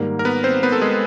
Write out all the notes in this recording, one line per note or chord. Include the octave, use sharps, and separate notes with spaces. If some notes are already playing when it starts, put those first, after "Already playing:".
Already playing: G#2 D#3 G3 A#3
A#4
B3 B4
C4 C5
B3 B4
A4
G#3 G#4